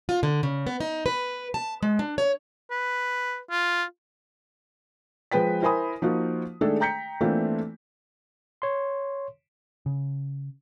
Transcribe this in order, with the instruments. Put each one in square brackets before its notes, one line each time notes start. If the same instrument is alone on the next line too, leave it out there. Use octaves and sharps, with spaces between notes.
[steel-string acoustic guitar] F4
D3
C#3
B3
D#4
B4
A5
G#3
D4
C#5
[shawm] B4
F4
[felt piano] F3 G#3 B4 G5 B6
E4 A#4 C5 G#5 B5 D#6
F3 A#3 D#4 F4 F#4
D#3 G#3 A3 D4 G#4 A4
G5 A#5 G6 B6 C#7
E3 A3 A#3 C4 D4 F4
[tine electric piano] C#5 C6
[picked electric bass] C#3